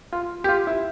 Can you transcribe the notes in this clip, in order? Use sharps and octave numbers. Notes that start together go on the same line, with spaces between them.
F4
G4
F4
E4